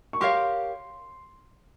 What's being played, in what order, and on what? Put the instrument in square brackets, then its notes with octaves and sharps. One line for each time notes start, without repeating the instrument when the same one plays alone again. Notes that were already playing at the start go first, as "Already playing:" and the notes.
[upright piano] C#6
[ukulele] G4 A#4 C#5 F5 [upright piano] C6